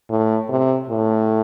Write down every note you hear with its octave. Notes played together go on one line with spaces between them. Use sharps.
A2
C3
A2